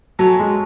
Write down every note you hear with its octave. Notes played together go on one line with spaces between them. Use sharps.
F#3 A4 C#5 E5 G#5
G#3